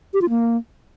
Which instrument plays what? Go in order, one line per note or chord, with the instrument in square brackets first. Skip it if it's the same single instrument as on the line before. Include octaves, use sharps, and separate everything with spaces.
[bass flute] G4
F4
A#3